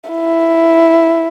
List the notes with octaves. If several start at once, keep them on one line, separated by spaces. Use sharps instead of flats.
E4